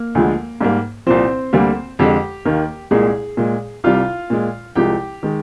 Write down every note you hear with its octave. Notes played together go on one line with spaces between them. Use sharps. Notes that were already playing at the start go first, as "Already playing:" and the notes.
Already playing: A#3
D2 D3 F3 G#3
G#2 G3 A#3
C2 A#2 F3 C4 C5
D2 D3 G3 A#3
F2 D3 G#3 G4
D#2 D#3 A#3
C2 A#2 G#3 G#4
A#2 G#3
C2 C3 G3 F4 F5
A#2 G#3
C2 C3 F3 G#3 G4 G5
D#3 G#3